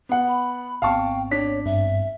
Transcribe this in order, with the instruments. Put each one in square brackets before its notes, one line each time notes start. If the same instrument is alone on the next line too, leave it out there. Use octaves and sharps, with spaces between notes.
[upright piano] B3 F#5
[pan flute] B5
[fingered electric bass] G#1 B3 C4 [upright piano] F5 A5 C#6 [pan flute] G5
[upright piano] D4 B6 [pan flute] C#5
[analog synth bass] G2 [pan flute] E5